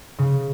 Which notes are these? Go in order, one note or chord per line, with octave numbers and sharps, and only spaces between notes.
C#3